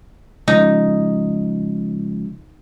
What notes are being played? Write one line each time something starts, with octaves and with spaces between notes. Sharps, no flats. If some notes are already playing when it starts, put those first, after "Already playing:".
C#3 F3 G#3 D#4